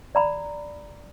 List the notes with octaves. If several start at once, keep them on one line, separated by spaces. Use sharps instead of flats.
D5 A#5 B5